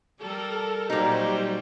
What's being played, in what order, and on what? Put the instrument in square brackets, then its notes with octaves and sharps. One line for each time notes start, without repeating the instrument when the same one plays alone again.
[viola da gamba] G3 [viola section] A4 A#4
[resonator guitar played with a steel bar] A#2 D#4 [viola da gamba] F#3 G3 [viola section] F#4 G4 C5